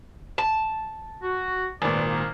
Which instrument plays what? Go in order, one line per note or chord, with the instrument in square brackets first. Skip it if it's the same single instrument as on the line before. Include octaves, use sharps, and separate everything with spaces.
[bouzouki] A5
[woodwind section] F#4
[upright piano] G#1 A#2 [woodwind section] B4 D5
[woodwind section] A#3